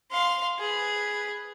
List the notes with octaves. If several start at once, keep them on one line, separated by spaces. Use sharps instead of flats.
F5 C6
G#4 B4